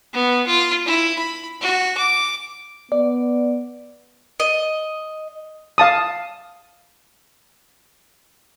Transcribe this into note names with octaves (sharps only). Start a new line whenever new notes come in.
B3
F4
E4
B5
F#4
D6
B3 D5
D#5
F5 A5 D#6